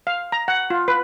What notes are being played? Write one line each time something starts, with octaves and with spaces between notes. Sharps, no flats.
F5
A#5
F#5
F4
B4